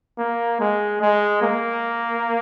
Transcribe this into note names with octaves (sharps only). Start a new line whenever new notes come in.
A#3
G#3
G#3
A#3